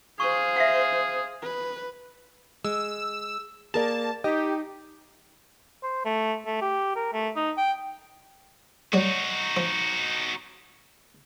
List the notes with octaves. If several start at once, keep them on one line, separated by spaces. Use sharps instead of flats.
G#4 C5 F5 C#6
E5 F#5
B4
G#3 E6
A#3 G#4 A#4 D5 A5
D#4 G4 D#5
C5
A3
A3
G4
A#4
A3
D#4
G5
F#3 G3 D#4 F#4
F3